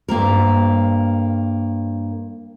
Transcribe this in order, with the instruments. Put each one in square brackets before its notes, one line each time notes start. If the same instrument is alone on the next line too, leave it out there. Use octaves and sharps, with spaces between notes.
[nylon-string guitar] G2 A#3 C4 A#4